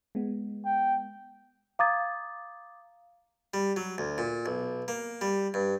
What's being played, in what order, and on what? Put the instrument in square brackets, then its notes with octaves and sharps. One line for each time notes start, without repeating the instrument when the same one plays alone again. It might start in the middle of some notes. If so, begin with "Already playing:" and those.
[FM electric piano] G#3 B3
[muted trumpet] G5
[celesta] F5 A#5 D6 D#6 G#6 A6
[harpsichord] G3
F#3
D2
A#2
B1
A#3
G3
G2